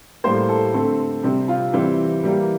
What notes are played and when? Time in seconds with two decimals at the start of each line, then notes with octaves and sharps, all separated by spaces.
0.24 A2 G3 A#3 C5
0.49 A4
0.74 D3 A3 C4
1.23 C3 G3 C4 G4
1.48 F4
1.73 E3 G3 C4 G4
2.23 E3 G3 A#3 G4